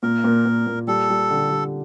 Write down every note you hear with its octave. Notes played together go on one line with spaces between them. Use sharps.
A#2 A#4
A#2
A#2
A#2
G3 A4
G3
D3
G3